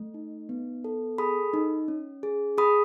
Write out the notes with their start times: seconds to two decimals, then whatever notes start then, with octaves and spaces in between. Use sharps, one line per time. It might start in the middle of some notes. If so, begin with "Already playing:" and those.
Already playing: A3
0.14 D#4
0.49 B3
0.84 A4
1.18 G#4 B5 D#6
1.54 D#4
1.88 C#4
2.23 G#4
2.58 G#4 B5 D#6